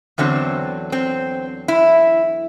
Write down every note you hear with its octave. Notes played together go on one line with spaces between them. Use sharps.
E2 D3 F#3 C4
C4
E4